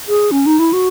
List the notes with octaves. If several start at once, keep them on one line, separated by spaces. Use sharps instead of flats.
G#4
C#4
D#4
E4
F#4